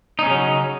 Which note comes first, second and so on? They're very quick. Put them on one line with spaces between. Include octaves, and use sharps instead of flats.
D#4 C#4 C#3 F#3